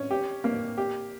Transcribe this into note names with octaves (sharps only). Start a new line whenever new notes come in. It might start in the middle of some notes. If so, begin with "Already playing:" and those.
Already playing: C#4
G4
A#3
G4